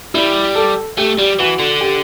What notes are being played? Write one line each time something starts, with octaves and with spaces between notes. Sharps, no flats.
G3 E4
A4
A3 G4
G3
E3 F#4
D3
G4